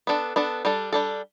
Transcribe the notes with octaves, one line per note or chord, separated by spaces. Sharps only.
B3 D4 A4
B3 D4 A4
G3 D4 A4
G3 D4 A4